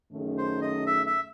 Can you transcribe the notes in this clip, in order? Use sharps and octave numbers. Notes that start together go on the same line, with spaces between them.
F#2 D#3 A3 C#4 G#4
C5
D#5
E5
E5